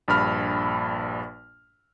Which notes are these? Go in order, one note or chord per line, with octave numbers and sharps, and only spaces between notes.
A#1 G2 B5 F6